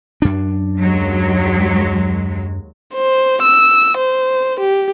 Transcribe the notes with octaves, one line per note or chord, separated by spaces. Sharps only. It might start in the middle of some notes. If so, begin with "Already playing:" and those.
F#2 D4
D#2 F#3 G#3
C5
E6
C5
G4